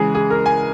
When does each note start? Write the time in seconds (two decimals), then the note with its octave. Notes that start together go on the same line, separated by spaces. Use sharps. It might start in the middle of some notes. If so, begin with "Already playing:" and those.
Already playing: C#3 E3 G#3 G#4
0.15 G#4
0.30 A#4
0.46 G#5